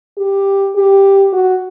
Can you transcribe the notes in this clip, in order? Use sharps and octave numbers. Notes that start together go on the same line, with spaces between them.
G4
G4
F#4